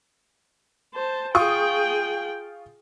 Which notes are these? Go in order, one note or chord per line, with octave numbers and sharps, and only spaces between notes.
C5 A5
F4 G#4 G5 C#6 D#6